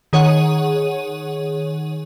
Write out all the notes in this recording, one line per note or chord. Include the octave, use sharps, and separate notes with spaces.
D#3 G#4 C#5 F#5 D#7